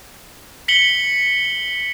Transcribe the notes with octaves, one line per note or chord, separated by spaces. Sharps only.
B6 C#7 F#7 G7